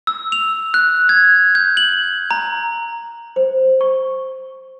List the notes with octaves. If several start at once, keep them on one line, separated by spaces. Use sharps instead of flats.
E6
F7
F#6
G#6
G6
F#7
A#5
C5
C#6